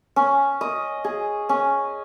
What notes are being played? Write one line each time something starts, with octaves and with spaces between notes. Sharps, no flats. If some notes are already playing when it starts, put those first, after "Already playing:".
C#4
D#5
G#4
C#4